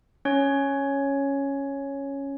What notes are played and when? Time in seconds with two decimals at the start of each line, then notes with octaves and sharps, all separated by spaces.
0.25 C#4 C#5